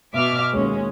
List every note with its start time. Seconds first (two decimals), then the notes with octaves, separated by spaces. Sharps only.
0.15 B2 E5 D6 F6
0.53 D#2 G#3 C#4